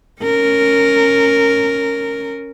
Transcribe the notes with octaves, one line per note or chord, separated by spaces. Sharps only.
C#4 A#4